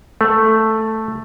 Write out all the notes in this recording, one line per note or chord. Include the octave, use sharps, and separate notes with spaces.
A3